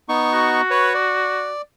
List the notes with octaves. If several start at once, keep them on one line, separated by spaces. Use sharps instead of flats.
B3 D#4 C#6
F#4
B4 C#5
D5